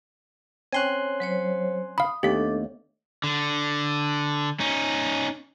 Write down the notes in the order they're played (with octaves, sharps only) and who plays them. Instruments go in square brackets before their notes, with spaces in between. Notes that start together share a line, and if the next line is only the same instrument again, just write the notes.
[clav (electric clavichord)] C4 C#4 [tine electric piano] G#5 C6 F#6
[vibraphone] F#3 C5 C#5
[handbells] F5 B5 [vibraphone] D#6
[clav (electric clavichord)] D#2 [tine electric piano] A3 B3 [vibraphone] D4 A4 [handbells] G4 B6
[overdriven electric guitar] D3
C#4 D#4